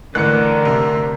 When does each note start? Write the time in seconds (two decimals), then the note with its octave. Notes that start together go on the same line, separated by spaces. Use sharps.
0.15 A1 D3 E3 A3 A#4 F#6 C#7
0.65 C3